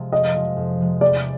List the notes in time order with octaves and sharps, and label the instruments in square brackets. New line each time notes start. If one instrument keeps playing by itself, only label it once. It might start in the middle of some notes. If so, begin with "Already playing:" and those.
Already playing: [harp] C3 F3 G#3
[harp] F2 [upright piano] D#5
[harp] C3 F3 G#3
F2
C3 F3 G#3
[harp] E2 [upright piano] D5